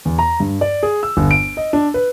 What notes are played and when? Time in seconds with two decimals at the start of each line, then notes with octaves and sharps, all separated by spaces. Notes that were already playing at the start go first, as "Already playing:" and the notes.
0.05 E2
0.19 A#5
0.40 G2
0.61 D5
0.83 G#4
1.03 E6
1.17 G1
1.31 D7
1.57 D#5
1.73 D4
1.94 B4